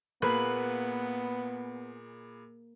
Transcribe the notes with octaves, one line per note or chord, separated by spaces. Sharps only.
A#2 A#3 B3 G#4 B4 B5 F#6